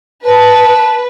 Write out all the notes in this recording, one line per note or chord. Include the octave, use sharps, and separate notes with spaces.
B4 A5